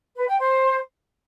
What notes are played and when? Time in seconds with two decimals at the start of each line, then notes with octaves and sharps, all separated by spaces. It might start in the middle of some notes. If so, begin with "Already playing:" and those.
0.17 B4
0.27 G5
0.38 C5